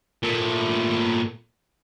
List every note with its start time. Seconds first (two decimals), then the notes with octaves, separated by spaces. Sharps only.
0.23 A#2 A3